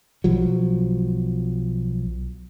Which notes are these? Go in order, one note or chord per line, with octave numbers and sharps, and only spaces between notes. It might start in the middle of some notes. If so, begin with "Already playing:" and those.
B1 F3 F#3